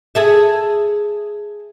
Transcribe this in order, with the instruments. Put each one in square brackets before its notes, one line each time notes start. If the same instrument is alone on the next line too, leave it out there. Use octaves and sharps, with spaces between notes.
[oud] G#4 A4 E5